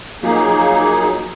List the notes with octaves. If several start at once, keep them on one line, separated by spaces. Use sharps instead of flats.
F3 F#3 A#3 D#4 G#4